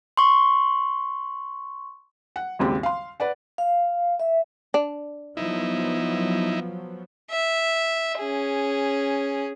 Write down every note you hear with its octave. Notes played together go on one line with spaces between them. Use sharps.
C6 C#6
F#5
G#1 D#2 C#3 C4 G4
F5 C6
B4 D5 F#5
F5
E5
D4
F3 F#3 B3 D#4 E4
E5
C#4 G#4